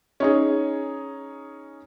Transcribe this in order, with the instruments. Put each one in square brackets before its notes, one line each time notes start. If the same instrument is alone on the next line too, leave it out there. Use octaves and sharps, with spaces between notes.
[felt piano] C#4 D#4 G#4